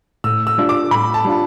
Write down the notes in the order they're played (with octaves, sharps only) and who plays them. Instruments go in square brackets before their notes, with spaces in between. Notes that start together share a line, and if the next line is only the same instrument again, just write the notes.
[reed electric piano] A2 [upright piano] E6
[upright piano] E6
[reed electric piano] G3 D4 F4
[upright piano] D6
[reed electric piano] A2 [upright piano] B5
[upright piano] A5
[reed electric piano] G3 D4 F4